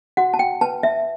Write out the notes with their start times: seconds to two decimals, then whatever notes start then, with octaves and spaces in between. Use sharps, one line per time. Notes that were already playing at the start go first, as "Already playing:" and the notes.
0.17 F#4 F#5
0.34 A5
0.39 G5
0.61 B4 A5
0.83 E5